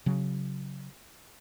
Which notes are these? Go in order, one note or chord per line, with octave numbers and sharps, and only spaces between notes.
C#3 F#3